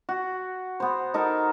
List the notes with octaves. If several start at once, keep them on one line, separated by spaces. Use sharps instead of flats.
F#4
B3 C5
D#4 A4 A#4